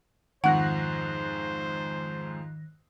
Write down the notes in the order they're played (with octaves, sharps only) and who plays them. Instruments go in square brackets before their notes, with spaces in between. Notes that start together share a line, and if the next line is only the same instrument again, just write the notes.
[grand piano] F2 G#2 C#6 [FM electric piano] D#3 F#6 A#6 [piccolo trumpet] C5 [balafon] F#5